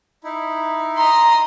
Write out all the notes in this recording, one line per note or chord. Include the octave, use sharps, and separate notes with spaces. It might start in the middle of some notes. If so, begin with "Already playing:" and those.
D#4 E4
D#5 A#5 C6